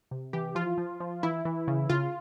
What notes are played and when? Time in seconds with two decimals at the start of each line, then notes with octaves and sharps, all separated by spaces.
0.11 C3
0.33 E3 G4
0.55 F3 F4
0.78 F3
1.00 F3
1.23 E3 E4
1.45 E3
1.68 C#3
1.89 C#3 F4